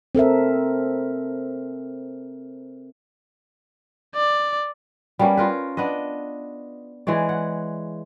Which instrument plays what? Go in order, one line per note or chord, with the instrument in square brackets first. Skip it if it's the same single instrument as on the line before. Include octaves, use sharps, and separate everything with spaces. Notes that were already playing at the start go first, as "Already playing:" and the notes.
[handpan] C4 A4 A#4 E5
[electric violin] D5
[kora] G3 A#3 B3 C#4
F4 A#4 B4
B3 D4 B4 D#5
E3 G#3 C#5 D5
F#5